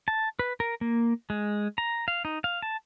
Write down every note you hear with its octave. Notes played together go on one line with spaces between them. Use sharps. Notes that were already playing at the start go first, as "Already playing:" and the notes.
A5
B4
A#4
A#3
G#3
A#5
F5
D#4
F5
A5